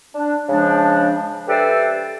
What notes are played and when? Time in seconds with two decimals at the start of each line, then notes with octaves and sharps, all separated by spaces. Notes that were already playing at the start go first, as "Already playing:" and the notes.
0.14 D4
0.49 C#3 F3 G#3 D4
1.48 G4 A4 B4 C5 D5 E5